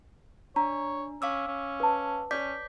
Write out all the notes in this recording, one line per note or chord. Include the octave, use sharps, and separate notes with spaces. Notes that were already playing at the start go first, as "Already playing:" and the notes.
D4 C#5 A#5
C#4 F5 D6 E6
C#4
B4 A5
C#4 C#5 D5 D6 G6 B6